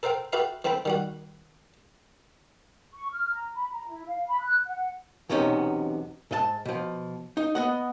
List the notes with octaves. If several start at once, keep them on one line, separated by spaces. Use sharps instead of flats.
A4 A#4 C5 F5 G5
F#4 G4 A4 B4 E5 F5
E3 C4 A4 G5 B5
D#3 G3 F#4
C#6
F6
A#5
B5
A#5
E4
F5
B5
F#6
F#5
B1 E2 C3 B3 C#4 D#4
G#2 D#5 A5
B2 F3
D#4
B3 D#5 F#5